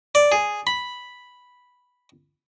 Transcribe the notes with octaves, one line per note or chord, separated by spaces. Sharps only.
D5
G#4
B5